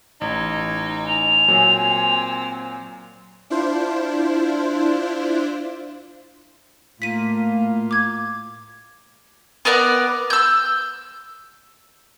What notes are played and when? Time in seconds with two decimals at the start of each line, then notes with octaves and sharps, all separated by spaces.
0.21 A1 D#4 G#6
1.07 G#5 F7
1.48 A#2 F#3 C4
3.50 D4 E4 F4 C5
7.02 A2 A#3 F4 B6 D#7
7.91 D6 G#6
9.65 B3 A#4 D5 F#5
10.30 E6 G6